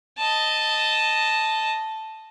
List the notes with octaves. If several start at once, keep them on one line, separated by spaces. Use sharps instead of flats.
D#5 A5